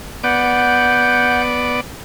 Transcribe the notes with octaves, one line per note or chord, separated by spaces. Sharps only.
B3 D5 F#5 G6